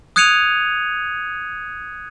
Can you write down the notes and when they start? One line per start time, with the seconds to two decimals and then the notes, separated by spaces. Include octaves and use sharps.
0.16 D#6 F#6 G#6 C#7 D#7 F7